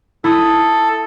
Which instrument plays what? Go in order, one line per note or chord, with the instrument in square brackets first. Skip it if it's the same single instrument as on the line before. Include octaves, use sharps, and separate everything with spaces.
[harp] E4 B5 D#6 [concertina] A4